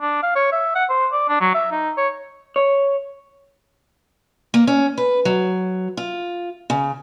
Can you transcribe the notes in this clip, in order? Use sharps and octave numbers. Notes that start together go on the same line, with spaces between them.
D4
F5
C#5
E5
F#5
C5
D5
D4
F#3
E5
D#4
C#5
C#5
A#3
C#4
B4
F#3
F4
C#3